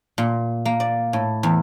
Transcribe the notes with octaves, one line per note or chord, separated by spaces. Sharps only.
A#2
A#3
D5
A2
E2